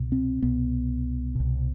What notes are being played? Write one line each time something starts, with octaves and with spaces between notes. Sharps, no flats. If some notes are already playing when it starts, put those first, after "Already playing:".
Already playing: C2 B2
C4
C2 B2 B3
C2 B2